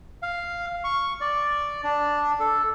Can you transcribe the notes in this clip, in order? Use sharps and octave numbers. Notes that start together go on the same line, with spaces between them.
F5
C#6
D5
D4
A4